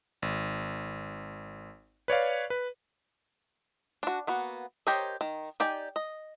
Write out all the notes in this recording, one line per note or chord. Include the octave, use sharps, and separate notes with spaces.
G#1
B4 C#5 D5 F5
B4
D4 F#4
A#3 B3 F#4
G4 A#4 C5 C#5 D#5
D#3
D#4 G4 D5 G5 G#5
D#5